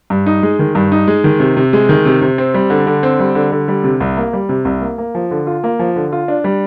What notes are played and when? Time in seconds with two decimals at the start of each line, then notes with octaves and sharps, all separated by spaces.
0.10 G2
0.26 D#4
0.43 G#3
0.59 D#3
0.75 G2
0.92 D#4
1.08 G#3
1.24 D#3
1.40 C3
1.57 C3
1.73 G#3
1.89 D#3
2.06 C3
2.21 C3
2.38 C4
2.54 G3
2.70 D3
2.87 D3
3.03 C4
3.19 G3
3.35 D3
3.52 D3
3.68 G3
3.84 C3
4.00 C2
4.17 A#3
4.33 G3
4.49 C3
4.65 C2
4.82 A#3
4.98 A#3
5.15 F3
5.31 D3
5.47 F4
5.64 A#3
5.79 F3
5.96 D3
6.12 F4
6.28 D4
6.44 G3